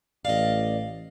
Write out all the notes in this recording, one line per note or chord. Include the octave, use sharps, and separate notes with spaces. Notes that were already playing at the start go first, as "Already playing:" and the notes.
A1 D5 D#5 F5